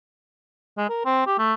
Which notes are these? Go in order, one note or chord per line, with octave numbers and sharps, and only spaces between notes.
G#3
A#4
C4
G4
A3